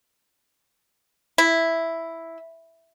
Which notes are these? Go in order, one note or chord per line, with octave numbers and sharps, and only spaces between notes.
E4